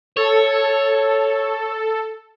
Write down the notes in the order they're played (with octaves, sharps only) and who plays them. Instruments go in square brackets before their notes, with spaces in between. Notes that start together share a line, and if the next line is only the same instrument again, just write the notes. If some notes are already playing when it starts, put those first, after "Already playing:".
[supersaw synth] A4 [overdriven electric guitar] C#5